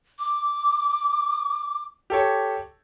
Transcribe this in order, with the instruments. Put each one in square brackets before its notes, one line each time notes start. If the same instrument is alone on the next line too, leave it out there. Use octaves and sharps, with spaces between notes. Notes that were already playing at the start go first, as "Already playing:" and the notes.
[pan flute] D6
[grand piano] G4 A4 C#5